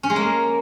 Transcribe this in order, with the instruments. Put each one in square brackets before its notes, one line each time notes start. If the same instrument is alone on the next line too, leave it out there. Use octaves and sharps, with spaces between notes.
[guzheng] C#4
G#3
A#3